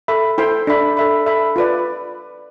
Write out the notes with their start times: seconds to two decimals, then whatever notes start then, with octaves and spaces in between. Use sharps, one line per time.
0.08 A4 E5 B5
0.38 E4 A4 C5 G5 C6
0.67 D4 A4 E5 B5
0.97 A4 E5 B5
1.26 A4 E5 B5
1.56 F4 B4 D5